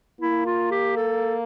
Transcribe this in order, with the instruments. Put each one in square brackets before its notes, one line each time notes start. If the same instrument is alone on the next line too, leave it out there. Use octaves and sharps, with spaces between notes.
[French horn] A#3 [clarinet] E4
[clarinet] F4
G4
A4